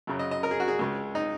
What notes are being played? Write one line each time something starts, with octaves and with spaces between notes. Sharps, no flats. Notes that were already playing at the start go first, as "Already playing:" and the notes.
F#2 C#3 F#3
D#5
D#5
A#4
G#4
F#4
G#4
C#2 C#3 G#3
D#4